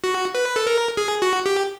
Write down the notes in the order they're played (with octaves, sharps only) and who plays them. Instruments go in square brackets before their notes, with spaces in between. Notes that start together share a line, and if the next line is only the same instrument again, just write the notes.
[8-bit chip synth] F#4
B4
A4
A#4
G#4
F#4
G4